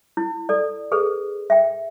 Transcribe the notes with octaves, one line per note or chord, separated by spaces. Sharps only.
E4
A4 D5
G#4 A4 B4
E5 G5